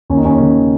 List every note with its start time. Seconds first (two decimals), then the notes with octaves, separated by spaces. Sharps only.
0.10 D#2 C#4
0.17 D#4
0.25 D#2 C#4
0.40 C#3